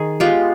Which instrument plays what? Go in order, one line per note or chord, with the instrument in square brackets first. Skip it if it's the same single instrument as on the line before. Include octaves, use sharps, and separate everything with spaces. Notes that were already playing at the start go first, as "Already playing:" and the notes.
Already playing: [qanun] D#3 G#4
G#3 B3 F4 G4